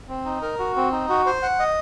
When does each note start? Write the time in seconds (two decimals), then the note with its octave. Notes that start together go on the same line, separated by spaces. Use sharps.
0.08 C4
0.25 D#4
0.42 A#4
0.59 F#4
0.76 C4
0.92 D#4
1.09 F#4
1.26 C5
1.42 F#5
1.59 D#5